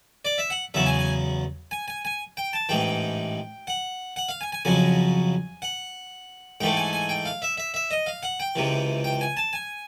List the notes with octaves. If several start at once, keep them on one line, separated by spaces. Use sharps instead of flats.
D5
E5
F#5
E2 C#3 F#3 E5
G#5
G#5
G#5
G#5
G#5
G5
A5
A1 G#2 E3 G5
F#5
F#5
F5
G#5
G#5
F2 C#3 F#3 G#5
F#5
G#2 E3 A3 G5
G#5
G#5
G5
F5
E5
E5
E5
D#5
F5
F#5
G5
C#2 C3 E3
G5
G#5
A5
G#5